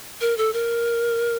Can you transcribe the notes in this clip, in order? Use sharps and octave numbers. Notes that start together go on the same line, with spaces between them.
A#4
A4
A#4